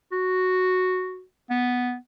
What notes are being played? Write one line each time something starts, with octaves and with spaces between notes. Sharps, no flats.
F#4
B3